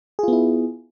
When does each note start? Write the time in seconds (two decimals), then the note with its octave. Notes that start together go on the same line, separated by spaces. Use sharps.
0.19 G#4
0.23 F4
0.28 B3
0.33 E4